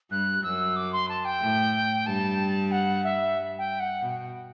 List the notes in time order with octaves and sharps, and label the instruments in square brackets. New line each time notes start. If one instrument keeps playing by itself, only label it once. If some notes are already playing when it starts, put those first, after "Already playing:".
[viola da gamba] G2 G3 [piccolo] F#6
[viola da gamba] F#2 F#3 [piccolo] E6
[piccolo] D6
C6
A5
G5
[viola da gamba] A2 A3
[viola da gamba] G2 G3 [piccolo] A5
[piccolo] F#5
E5
G5
F#5
[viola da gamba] B2